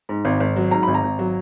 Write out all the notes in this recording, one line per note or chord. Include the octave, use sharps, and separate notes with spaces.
G#2
G#1
G#1
F#3
G#2 A#5
G#1 B5
A#5
G#1
F#3